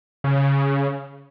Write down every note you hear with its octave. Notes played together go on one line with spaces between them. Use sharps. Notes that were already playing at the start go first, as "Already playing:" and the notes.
C#3